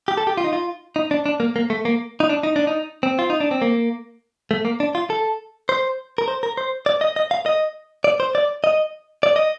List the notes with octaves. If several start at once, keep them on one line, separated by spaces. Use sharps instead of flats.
G4
A4
G4
F4
D#4
F4
D#4
D4
D4
A#3
A#3
A3
A#3
D#4
D4
D#4
D4
D#4
C4
F4
D#4
D4
C4
A#3
A3
A#3
D4
F4
A4
C5
A#4
C5
A#4
C5
D5
D#5
D#5
F5
D#5
D5
C5
D5
D#5
D5
D#5